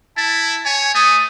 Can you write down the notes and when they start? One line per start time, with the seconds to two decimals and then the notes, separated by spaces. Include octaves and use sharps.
0.17 E4 A5
0.65 C#5 G#5
0.95 A3 D#6